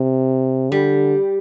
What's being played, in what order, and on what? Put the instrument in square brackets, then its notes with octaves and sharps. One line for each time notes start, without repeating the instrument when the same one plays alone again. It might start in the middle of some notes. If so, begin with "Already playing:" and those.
Already playing: [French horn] C3
[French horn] D3 [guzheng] G3